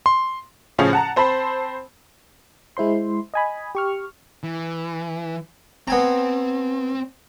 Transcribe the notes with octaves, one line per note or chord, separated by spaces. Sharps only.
C6
A2 C#3 F3 C#4 G#4
F#5 A5 A#5
C4 C5 A5 B5
G#3 E4 C5 C6
D#5 G#5 B5
G4 C#6 F6
E3
B3 C4 G#5 A#5